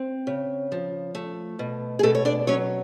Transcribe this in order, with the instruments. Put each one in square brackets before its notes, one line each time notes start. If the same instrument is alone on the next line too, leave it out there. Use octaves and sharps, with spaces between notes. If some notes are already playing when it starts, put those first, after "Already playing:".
Already playing: [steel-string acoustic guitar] C4
C#3
F3
A3
B2
G#4
B2 A3 A4
C#5
D4 D5
F#3 C#4 C#5